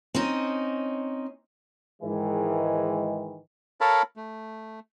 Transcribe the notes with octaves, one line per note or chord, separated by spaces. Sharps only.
C4 C#4 D#4
G#2 D#3 E3 G#3
A4 A#4 C#5 F5 A5 B5
A3